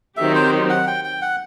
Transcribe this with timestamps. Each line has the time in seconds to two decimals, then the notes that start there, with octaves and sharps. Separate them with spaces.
0.17 D#3 F#3 C4 D#4 G4 E5
0.35 C5
0.70 F#5
0.87 G5
1.04 G5
1.22 F#5